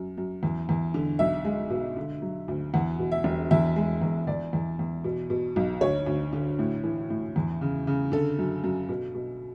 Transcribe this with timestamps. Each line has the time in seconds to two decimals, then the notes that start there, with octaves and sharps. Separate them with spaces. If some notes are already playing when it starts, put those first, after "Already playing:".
Already playing: F#2
0.18 F#2
0.43 E2
0.69 E2
0.94 D3
1.19 B1 E5
1.45 G#3
1.70 B2
1.97 D3
2.22 F#3
2.48 D2
2.74 E2 F#5
2.99 B2
3.12 E5
3.24 E1
3.51 E2 E5
3.76 G#3
4.02 E2
4.27 E2 D5
4.53 E2
4.79 E2
5.04 B2
5.30 B2
5.56 B1
5.81 D2 C#5
6.06 D2
6.33 D3
6.59 A2
6.84 E3
7.10 A2
7.36 E2
7.61 C#3
7.87 C#3
8.12 D3 A4
8.39 F#2
8.64 F#2
8.89 B2
9.15 B2